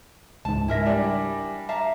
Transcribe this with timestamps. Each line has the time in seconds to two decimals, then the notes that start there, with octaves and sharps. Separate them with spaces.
0.45 C#2 G#2 A5
0.68 E4 A#4 E5 G#5 A#6
0.86 G3 D4
1.69 E5 F5 A5 A#5